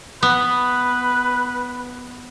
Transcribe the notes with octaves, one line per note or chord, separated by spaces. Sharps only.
B3 B4